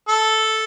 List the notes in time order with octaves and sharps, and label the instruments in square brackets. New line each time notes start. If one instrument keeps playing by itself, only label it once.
[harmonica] A4